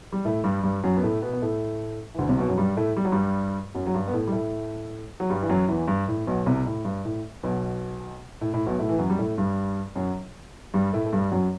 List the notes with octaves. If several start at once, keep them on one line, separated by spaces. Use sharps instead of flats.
G3
A2 A3
G2 G3
G2 G3
F#2 F#3
B3
A2 A3
B2 B3
B3
A2 A3
E3
D2 D3
C2 C3
B1 B2
F#2 F#3
G2 G3
A2 A3
G3
F#3
G2 G3
F#2 F#3
F#3
G2 G3
B3
A2 A3
G3
A2 A3
F#3
G2 G3
E3
F#2 F#3
E2 E3
G2
A2
B1 B2
C2 C3
A2
G2
A2
B1 B2
A2
A2
B1 B2
A2 A3
E3
F#2 F#3
G3
A2 A3
G2 G3
F#2 F#3
G2 G3
A2 A3
A3
G2 G3
F#2 F#3